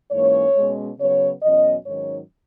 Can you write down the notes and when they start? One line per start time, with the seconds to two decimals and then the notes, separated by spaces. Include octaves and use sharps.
0.11 G#2 E3 A#3 C#4 C#5
0.56 B2 G#3 C#4
0.99 C#3 F#3 B3 C#5
1.42 E2 B2 F#3 C#4 D#5
1.86 G#2 D#3 F#3 C#4 C#5